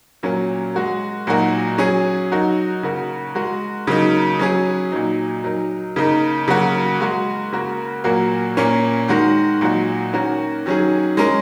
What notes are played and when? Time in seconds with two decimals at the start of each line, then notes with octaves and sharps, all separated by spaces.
0.23 A#2 F#3 C#4 A#4
0.74 G#3 F#4 A#4
1.27 A#2 F#3 D#4 F#4 A#4
1.78 F#3 C#4 G#4
2.31 F#3 D#4 F#4 A#4
2.83 C#3 A#3 F#4 A#4
3.35 G#3 F#4 A#4
3.87 C#3 F#3 A#3 D#4
4.39 F#3 C#4 G#4
4.92 A#2 F#3 D#4
5.44 F#3 D#4 A#4
5.96 C#3 A#3 D#4 A#4
6.48 C#3 F#3 A#3 F#4
7.00 G#3 F#4 A#4
7.52 C#3 A#3 F#4 A#4
8.04 A#2 F#3 A#3 F#4 A#4
8.57 A#2 A#3 C#4
9.08 D#3 G#3 F#4 A#4
9.61 A#2 F#3 D#4 F#4
10.13 D#3 A#3 C#4 F#4 A#4
10.66 D#3 F#3 C#4 G#4
11.17 G#3 C#4 A#4